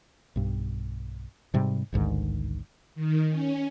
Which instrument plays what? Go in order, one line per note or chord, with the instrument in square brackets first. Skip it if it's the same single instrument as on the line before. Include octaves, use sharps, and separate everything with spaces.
[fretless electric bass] B1 G2
G#2 C3 G3
A1 D2 G#2 D#3
[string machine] D#3
C#4